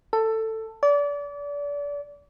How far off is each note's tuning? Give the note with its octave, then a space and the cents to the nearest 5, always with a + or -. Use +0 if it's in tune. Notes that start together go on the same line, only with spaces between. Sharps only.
A4 +15
D5 -30